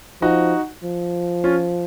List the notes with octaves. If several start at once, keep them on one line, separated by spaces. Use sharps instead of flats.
F3 D#4 F#4
F3
C#4 F4